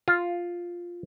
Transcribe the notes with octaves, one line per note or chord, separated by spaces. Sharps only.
F4